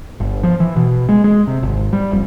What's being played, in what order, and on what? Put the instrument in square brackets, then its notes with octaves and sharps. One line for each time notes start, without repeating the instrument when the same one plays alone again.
[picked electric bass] G1
F3
E3
B2
G#3
G#3
C3
G#1
G3
F1